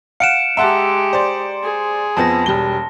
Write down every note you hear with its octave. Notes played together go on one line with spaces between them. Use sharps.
F5 F#5 C#7 D7 E7
G#3 G4 E5 F#5 A5 A#5 C6
C5 D5
G#4
F2 F3 B3 A5 A#6
E1 G3 G7